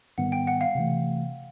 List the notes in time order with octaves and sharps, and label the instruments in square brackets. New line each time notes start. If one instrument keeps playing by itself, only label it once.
[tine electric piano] G#2 D#3 G3 B3 [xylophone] F#5
[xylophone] G5
F#5
F5
[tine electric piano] C3 E3 A3